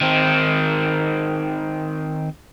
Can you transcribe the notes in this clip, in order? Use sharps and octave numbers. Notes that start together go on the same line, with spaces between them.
D#3 C4